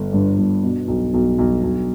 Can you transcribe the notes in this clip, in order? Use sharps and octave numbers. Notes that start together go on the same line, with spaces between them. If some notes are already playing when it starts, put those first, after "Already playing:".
Already playing: G1 D3
G2 D4
G1
B2
B1
B1
B1
B1